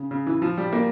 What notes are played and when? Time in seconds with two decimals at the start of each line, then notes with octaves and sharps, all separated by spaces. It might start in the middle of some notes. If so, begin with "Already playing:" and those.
Already playing: C#3
0.11 C#3
0.27 E3
0.42 F3
0.57 G3
0.73 A#3